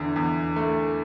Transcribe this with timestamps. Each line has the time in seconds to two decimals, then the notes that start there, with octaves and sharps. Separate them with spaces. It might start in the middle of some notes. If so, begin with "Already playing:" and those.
Already playing: E2 D3
0.16 E2
0.56 A3